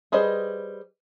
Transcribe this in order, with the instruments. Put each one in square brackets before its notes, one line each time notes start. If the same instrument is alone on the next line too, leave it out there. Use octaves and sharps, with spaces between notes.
[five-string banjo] G3 G#4 B4 C5 D#5